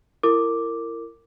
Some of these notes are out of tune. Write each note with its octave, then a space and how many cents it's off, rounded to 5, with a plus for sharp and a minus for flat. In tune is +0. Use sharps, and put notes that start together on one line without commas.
E4 +25 A#4 -25 D6 +0